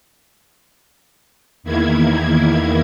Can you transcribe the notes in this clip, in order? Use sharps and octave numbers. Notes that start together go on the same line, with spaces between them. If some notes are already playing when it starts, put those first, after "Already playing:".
E2 D#3 A#3 E4 G#6